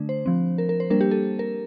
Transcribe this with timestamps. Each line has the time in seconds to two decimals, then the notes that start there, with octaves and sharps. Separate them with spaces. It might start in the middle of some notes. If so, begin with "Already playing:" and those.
Already playing: D3 A3 D4
0.09 C5
0.26 F3 C4
0.58 A#4
0.69 A#4
0.80 C5
0.90 G3 A#3 D4 A#4
1.01 G4
1.11 A4
1.39 A#4